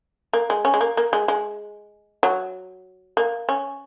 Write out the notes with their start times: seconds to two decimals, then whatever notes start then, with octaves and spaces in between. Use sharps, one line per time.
0.33 A#3
0.50 G#3
0.65 C#4
0.74 G#3
0.81 A#3
0.97 A#3
1.13 G#3
1.28 G#3
2.23 F#3
3.17 A#3
3.49 C#4